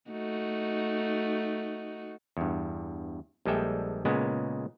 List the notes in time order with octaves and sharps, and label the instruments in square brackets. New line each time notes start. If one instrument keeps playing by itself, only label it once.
[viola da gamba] A3 D#4 F#4
[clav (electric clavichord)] E2 G2
A#1 G3 G#3 A4 E5 G5
A#2 C#3 G#3 B3